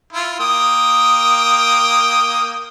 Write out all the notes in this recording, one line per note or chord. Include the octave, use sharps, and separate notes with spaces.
E4 F4
A#3 G5 D#6